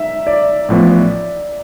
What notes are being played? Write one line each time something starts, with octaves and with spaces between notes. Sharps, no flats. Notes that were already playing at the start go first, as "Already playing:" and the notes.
Already playing: E5
D5
A1 A2 F3 B3